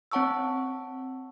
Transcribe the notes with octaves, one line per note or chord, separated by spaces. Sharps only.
C4 C#5 F#5 A5 C#6 E6